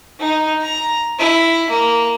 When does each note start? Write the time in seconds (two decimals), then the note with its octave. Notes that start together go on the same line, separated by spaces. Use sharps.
0.19 D#4
0.62 A#5
1.19 E4
1.70 A#3